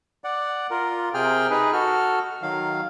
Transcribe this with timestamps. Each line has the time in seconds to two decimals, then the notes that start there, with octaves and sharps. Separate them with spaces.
0.24 D5 F#5
0.71 F4 A#4
1.14 C3 G#4 G5 F6
1.51 D#4 G#4 B4
1.73 F#4 A4 F6
2.42 D#3 F#3 F5